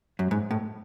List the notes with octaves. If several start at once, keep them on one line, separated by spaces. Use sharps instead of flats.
F#2
G#2
A2